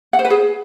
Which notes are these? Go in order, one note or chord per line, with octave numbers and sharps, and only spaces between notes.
F#5
C5
B4
G#4